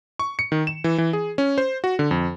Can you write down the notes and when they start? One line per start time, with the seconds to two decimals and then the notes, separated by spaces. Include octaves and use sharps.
0.19 C#6
0.39 C#7
0.52 D#3
0.67 E7
0.84 E3
0.98 E3
1.13 G#4
1.38 C#4
1.58 C5
1.84 F#4
1.99 D3
2.11 F2